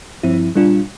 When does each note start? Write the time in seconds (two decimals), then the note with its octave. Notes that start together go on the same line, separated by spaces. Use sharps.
0.23 G2 F3 C4 E4
0.55 A#2 G3 D4 F4